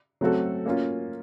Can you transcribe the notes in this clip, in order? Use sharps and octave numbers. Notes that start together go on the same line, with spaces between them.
F#3 A3 C4 F#4 A4
A#3 C#4 F4